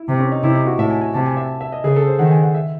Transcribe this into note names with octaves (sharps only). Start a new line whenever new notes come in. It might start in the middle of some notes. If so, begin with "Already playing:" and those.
Already playing: E4
C3
C#4
D#4
C3 E4
D#4
F#4
A2 E5
G#5
G#5
C3 A5
G#5
E5
E5
D#5
C#3 G#4
A4
C5
D#3 F#5
G#5
F#5
E5